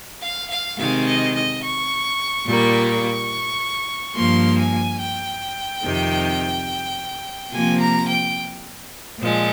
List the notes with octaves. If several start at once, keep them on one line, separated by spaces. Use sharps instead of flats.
F5
F5
C3 D#3 G#3 F5
D#5
D#5
C#6
A#2 G3 A#3 C#6
C#6
G2 F3 A#3 C6
G#5
G5
F2 C3 D#3
C3 F3 A#3 G#5
A#5
G5
A#2 F3 G#3